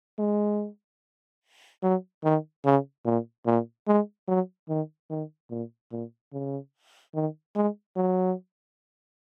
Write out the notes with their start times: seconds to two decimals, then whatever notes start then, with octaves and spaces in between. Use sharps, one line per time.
0.19 G#3
1.83 F#3
2.24 D#3
2.65 C#3
3.05 A#2
3.46 A#2
3.88 G#3
4.28 F#3
4.69 D#3
5.10 D#3
5.50 A#2
5.92 A#2
6.33 C#3
7.15 D#3
7.56 G#3
7.96 F#3